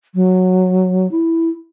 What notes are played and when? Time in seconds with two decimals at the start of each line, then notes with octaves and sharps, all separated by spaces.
0.15 F#3
1.11 E4